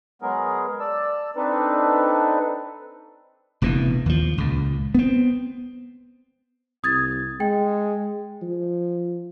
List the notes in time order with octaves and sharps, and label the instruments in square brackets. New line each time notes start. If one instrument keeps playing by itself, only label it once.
[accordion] F#3 G#3 B3 G#4 A#4
D5 A5 E6
C4 D4 D#4 A4 B4
[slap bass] F1 A#1 B2 E3
D#2 F3
C#2 A#2
B3 C4
[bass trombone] C2 [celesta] D#6 G#6 A6
[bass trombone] G#3 [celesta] G5
[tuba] F3